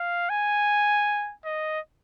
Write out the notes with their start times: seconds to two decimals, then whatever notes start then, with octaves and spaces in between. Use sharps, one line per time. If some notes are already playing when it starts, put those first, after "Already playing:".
Already playing: F5
0.30 G#5
1.45 D#5